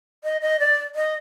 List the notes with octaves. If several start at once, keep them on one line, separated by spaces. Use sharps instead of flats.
D#5
D#5
D5
D#5